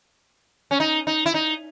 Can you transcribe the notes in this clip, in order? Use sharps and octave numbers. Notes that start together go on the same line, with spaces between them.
C#4
D#4
D#4
E4
D#4